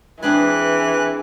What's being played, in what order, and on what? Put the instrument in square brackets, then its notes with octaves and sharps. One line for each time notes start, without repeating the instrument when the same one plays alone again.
[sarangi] E3 [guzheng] C4 D4 G#4 [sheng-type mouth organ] B4 F#6